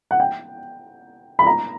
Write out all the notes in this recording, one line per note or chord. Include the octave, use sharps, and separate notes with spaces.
F#5
G5
B5
A#5